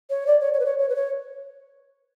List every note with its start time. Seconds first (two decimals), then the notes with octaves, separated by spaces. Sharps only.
0.10 C#5
0.27 D5
0.40 C#5
0.53 C#5
0.60 B4
0.66 C#5
0.78 C#5
0.89 B4
0.95 C#5